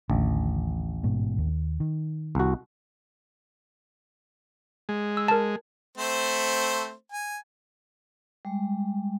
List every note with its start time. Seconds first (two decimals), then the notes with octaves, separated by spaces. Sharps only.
0.10 A1 D#2 D3
1.03 G#2 B2
1.38 D#2
1.80 D#3
2.35 C2 F#4
4.89 G#3
5.17 E6
5.28 A#4 A5
5.97 A3 C4 C5
7.12 G#5
8.45 G3 G#3